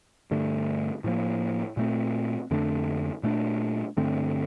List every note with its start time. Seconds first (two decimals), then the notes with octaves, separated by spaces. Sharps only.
0.31 G2 D3 A3
1.04 A2 F3 A#3
1.77 A#2 A3 C4
2.51 F2 D3 A3 D4
3.23 A#2 A3 D4
3.97 G2 D3 A3 C4